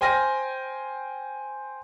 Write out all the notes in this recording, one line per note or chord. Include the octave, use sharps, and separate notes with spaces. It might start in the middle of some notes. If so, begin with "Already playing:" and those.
C5 G5 G#5 F6 A#6